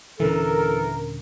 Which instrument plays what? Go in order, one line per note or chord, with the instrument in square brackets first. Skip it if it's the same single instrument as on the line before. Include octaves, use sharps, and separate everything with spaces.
[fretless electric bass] D#1 D3 C#4 [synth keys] E3 [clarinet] A4 [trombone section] A#4